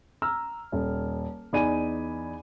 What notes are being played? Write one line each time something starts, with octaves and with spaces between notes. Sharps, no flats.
A#5 E6 F6
D#1
E2 D#4 D5 G#5 B5 D#7